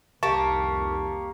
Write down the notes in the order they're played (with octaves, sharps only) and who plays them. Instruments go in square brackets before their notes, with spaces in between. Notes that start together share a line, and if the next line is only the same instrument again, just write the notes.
[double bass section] C2 F2 D#3 [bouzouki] A#3 G4 [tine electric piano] A5 [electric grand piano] C#6